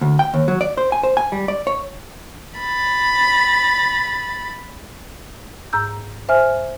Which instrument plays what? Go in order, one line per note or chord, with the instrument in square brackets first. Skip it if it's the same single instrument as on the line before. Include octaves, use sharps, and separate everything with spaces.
[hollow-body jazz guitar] D2
G5
D#2
F#3
D5
C5
G#5
C5
G#5
G3
D5
C#5
[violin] B5 A6
[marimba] G#2 A#5 E6 G6
C5 E5 G#5 F6